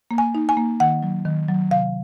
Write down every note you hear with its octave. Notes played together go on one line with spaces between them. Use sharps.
A#3
G#5
D#4
G#5
A#3
D#3 F#5
F#3
D#3
F#3
C3 F5